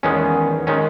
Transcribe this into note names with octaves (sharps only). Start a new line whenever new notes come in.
E2 D#3 G#3 B3 C#4
D#3 G#3 C#4